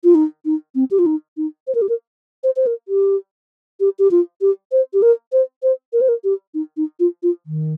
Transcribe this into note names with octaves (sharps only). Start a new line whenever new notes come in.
F4
D#4
D#4
C4
G4
F4
D#4
D#4
C5
A#4
G4
A#4
C5
C5
A#4
G4
G4
G4
F4
G4
C5
G4
A#4
C5
C5
A#4
C5
A#4
G4
D#4
D#4
F4
F4
D#3